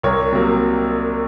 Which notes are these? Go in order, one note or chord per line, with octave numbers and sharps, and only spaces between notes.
C2 A#4 C#5
C3 F#3 A#3